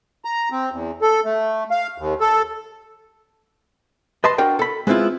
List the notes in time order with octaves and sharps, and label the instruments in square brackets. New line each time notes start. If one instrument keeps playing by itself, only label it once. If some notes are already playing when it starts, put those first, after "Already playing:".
[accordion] A#5
C4
E2
A4
A3
F5
D#2
A4
[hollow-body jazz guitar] B4 D#5 A5 C6
D4 F#4 A#4 G5
A4 B5
G#3 B3 C4 E4 F4